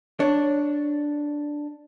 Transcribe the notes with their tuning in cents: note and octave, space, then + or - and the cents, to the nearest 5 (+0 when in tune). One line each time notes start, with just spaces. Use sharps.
D4 +0 C#5 +10